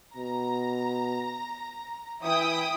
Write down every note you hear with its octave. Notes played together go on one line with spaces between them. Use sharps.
B2 A#5
E3 E4 G5 D#6